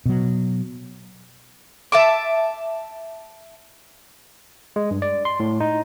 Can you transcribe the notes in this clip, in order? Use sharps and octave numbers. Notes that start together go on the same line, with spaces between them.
B2 F#3
E5 A5 D6
G#3
G2
D5
C6
A2
D#4